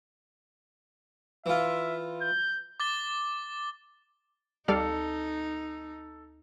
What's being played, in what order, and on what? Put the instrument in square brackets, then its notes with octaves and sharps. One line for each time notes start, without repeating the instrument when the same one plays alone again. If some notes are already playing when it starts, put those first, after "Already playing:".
[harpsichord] E3 F4 [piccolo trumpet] E5
[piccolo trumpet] G6
[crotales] D6 A6 G7
[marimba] D2 [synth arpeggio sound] G3 D5 F5 [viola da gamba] D#4 [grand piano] A4